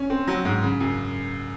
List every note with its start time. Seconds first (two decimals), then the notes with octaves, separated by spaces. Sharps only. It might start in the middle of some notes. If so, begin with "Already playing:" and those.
Already playing: C#4
0.10 C4
0.28 F#3
0.45 G#2
0.63 C#3
0.80 F#2